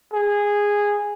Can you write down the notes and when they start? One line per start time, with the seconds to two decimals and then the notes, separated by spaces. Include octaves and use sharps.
0.13 G#4